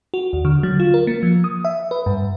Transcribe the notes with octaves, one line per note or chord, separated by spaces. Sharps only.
F#4
D#2
D3
F#3
F4
A#4
A#3
F3
D#6
E5
B4
G2